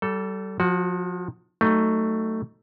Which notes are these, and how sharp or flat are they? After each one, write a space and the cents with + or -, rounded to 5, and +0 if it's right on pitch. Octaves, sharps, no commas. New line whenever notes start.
G3 -30 A4 +5
F3 +30 F#4 +0
F#3 +25 A3 +15 D#4 +0